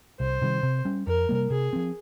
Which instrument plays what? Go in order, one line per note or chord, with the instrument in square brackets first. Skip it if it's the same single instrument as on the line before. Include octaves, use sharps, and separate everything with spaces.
[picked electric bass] C2 [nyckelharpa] C5
[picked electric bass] C3 D#3 G3
C3
G3 C#4
[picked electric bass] F2 [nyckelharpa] A#4
[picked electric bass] C3 G3 A#3
[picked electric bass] C3 [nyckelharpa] G#4
[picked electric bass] F3 C4